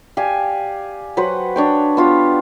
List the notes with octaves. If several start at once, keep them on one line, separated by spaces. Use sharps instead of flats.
G4 D5 F5 G#5
F#3 B4 C5 F#5
D4 C#5 G5
B3 F4 G4